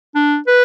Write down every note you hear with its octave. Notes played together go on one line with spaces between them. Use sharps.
D4
B4